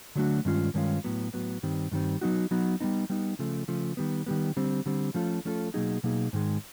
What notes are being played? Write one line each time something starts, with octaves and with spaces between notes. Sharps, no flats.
D3 F#3 A3 D4 F#4
G2 D#3 G#3 C#4 F4
G2 D#3 G#3 C#4 F4
A2 F#3 B3
A2 F#3 B3
G2 D#3 G3 C4
G2 D#3 G3 C4
F#3 B3 D#4 F#4
F#3 B3 D#4 F#4
G3 B3 D#4
G3 B3 D#4
C#3 F3 A3
C#3 F3 A3
D#3 G3 B3
D#3 G3 B3
D3 G3 C4
D3 G3 C4
F3 A3 C#4 F4 A4
F3 A3 C#4 F4 A4
B2 F#3 A#3 D#4 G#4
B2 F#3 A#3 D#4 G#4
G#2 D#3 G#3